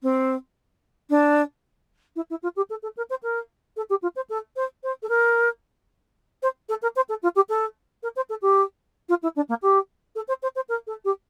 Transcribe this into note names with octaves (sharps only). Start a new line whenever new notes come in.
C4
D4
E4
E4
F4
G4
A4
A4
A#4
C5
A#4
A4
G4
F4
C5
A4
C5
C5
A4
A#4
C5
A4
A#4
C5
A4
F4
G4
A4
A#4
C5
A4
G4
F4
E4
D4
A#3
G4
A4
C5
C5
C5
A#4
A4
G4